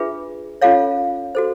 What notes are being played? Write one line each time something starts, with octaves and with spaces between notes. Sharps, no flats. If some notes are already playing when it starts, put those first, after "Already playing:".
Already playing: D4 F4 G#4 B4 E5
C#4 F4 A4 C#5 F5
F#4 A4 C5